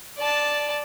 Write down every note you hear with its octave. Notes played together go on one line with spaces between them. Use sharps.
D5 A5